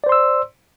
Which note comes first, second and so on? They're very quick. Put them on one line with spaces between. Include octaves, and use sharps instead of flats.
D5 C5 C6 E6